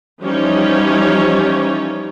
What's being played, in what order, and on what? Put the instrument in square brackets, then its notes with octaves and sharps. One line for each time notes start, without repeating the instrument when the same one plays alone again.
[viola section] E3 F3 G3 C#4 D#4 C#5